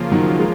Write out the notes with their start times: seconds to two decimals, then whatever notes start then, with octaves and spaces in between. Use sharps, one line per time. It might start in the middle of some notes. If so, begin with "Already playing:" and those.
Already playing: C#3 F3 A#3 F4
0.12 D#3 F#3
0.39 G#3